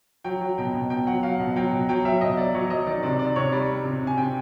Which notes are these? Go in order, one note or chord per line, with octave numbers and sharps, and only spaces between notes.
F#3 G5
F#3
B2 G5
B2
B2 G5
F#3 F#5
F#3 F5
B2
F#3 G5
B2
F#3 G5
F#3 E5
B2 D#5
F#3 D5
F#3 C#5
F#3 D#5
D#3 D5
C3 D5
D#3 D5
C3 C#5
G3 D5
G3
C3
C3
G#5
C3 G5